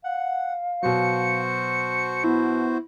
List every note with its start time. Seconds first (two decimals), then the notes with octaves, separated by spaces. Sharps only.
0.04 F5 F#5
0.83 B2 F#3 F#4 C5 C#7
2.24 B3 E4